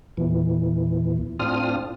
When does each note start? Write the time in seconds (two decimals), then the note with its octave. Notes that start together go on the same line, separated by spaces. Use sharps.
0.17 E2 A#2 E3
1.40 A2 C4 D4 F4 D#6 F6